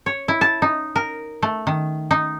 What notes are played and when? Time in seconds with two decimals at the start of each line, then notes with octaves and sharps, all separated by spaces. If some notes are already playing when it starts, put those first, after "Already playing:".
0.06 C#5
0.28 E4
0.41 A5
0.62 D#4
0.96 A#4
1.42 A3
1.67 D#3
2.11 D#4